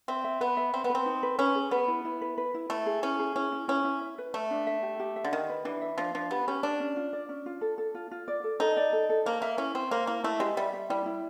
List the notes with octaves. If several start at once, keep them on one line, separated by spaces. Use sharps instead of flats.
C4 E5
E5
B3 B4
E5
C4 E5
B3
B4
C4
D#4
B4
C#4 B4
G#4
B3 B4
E4
E4
B4
B4
E4
A3 E4
G#4
C#4 E4
G#4
C#4 E4
E4
C#4 E4
E4
E5
B4
A3 E5
D4
E5
G4
G4
E5
D3
D#3 G4
B4
E3 D4
E5
F3 D4
F3 D4
B3 G4
C#4 G4
D4 D5
C#4
F4
D5
C#4
F4
A4
A4
F4
F4
D5
A4
D#4 A4
D5
A4
A4
A#3 C5
A#3 E5
C#4 E4
C4 C5
A#3 C5
A#3 E4
A3 E4
G#3 G4
G3 E5
E5
G3 E4
E4